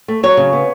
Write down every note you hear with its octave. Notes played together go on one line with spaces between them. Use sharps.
A3
F#3 C#5
C#3
B3